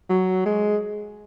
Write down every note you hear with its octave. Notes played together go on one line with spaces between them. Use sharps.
F#3
G#3